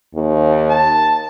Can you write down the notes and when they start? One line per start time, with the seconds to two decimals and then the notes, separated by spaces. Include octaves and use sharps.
0.15 D#2
0.70 A5